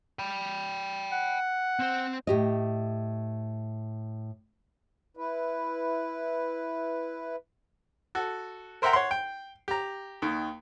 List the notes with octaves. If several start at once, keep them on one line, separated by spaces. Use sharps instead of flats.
G5 B5
F#5
C4 C5
A2 G4 D#5
E4 B4
F#4 A4
A#4 C5 E5 F#5 G5 A#5
C#5 F#5 C6
G5
G4 A#5
D#2 D#3